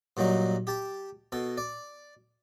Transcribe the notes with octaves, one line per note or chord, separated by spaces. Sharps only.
G2 A#2 F#3 D#4
G4 A5
B2 A4
D5